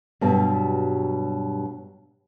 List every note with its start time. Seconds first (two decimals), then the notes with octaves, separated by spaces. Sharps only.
0.21 G2 B2 F#3 G3